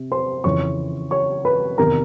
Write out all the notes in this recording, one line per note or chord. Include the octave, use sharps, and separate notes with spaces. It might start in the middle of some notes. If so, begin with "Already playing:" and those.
Already playing: C3
C5 C6
F2 C#3 E3 C#5 C#6
C#5 C#6
B4 B5
E2 C3 D#3 A#4 A#5